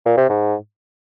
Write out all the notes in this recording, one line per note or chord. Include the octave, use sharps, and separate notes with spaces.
A#2
C3
G#2